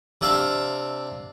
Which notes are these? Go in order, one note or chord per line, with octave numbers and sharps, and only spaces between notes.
C3 D4 E5 F5